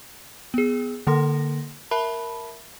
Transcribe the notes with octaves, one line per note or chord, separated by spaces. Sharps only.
B3 G#4
D3 A#3 A4 C6 A#6
A#4 E5 A5 B5